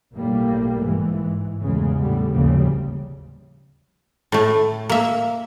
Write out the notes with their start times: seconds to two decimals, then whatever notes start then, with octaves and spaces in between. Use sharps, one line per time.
0.13 B1 A2 G3 A3 A#3
0.81 G#2 E3
1.62 A1 E2 A2 C#3 G#3
1.99 A2 D3 G3 B3
2.30 G#1 D#2 C#3 F3 G3
4.32 A2 A3
4.90 A#3 E5